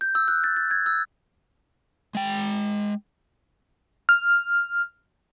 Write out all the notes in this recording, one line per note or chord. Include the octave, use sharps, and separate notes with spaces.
G6
E6
F#6
A6
A6
G#6
E6
G#3 G5
F6